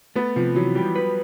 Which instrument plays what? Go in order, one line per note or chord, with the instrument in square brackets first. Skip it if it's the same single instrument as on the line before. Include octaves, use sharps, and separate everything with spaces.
[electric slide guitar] A3 [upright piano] B3
[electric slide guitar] C3 [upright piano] F3
[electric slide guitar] E3 [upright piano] F#3
[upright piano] G3 [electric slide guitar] G4
[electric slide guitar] B4